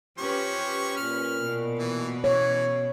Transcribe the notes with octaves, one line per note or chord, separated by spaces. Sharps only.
F3 C#4 G4 B4 C#5
A#2 F6
B2
E3
E3 C#5